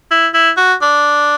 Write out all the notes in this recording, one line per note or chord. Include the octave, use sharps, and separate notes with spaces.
E4
E4
F#4
D4